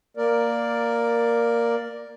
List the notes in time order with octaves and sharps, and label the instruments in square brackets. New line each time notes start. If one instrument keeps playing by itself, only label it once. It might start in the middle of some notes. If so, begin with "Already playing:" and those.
[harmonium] A#3 A#4 D5